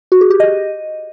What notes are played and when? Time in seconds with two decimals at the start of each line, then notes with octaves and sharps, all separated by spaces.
0.12 F#4
0.21 G#4
0.30 G4
0.40 D#5